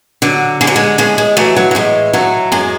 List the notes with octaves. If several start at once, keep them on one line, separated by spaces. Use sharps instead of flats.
D3 F#3
D3 G#3
F#3
G#3
A2 G#3
G#3
E3 F#3 A3
F#3
F#3
A2 G#3
A2 F#3 A3
F#2 G#3